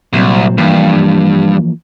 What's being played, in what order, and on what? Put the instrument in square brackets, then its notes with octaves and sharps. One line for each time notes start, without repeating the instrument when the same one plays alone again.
[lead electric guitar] C2 [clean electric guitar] A#2 F#3 C4
[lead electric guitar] G2 [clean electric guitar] E3 F3 A#3